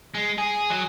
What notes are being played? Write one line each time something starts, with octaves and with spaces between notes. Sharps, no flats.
G#3
G#4
F#3